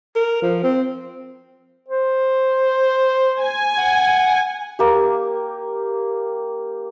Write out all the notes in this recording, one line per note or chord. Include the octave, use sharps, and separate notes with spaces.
A#4
F3
C4
C5
G#5
F#5
A#3 G4